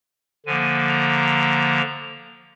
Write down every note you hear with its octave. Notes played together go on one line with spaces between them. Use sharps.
D3 F3 A#3 G#5
A#5